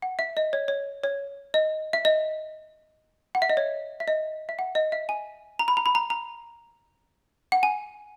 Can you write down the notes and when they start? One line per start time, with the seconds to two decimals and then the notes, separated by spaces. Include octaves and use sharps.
0.02 F#5
0.19 E5
0.37 D#5
0.53 C#5
0.68 C#5
1.04 C#5
1.54 D#5
1.93 E5
2.05 D#5
3.35 F#5
3.42 E5
3.50 D#5
3.57 C#5
4.00 E5
4.08 D#5
4.49 E5
4.59 F#5
4.75 D#5
4.92 E5
5.09 G#5
5.59 A#5
5.68 B5
5.77 A#5
5.86 B5
5.95 A#5
6.10 A#5
7.52 F#5
7.63 G#5